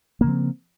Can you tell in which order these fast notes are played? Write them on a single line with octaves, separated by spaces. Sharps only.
A#3 C#3 F3 C4